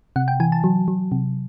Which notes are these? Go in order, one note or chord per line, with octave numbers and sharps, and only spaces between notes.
C3 F#5
G5
E3 G#5
A5
F#3
F#3
C3